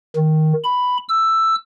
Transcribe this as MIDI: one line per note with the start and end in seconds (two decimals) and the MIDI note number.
0.16 0.53 51
0.64 0.97 83
1.09 1.55 88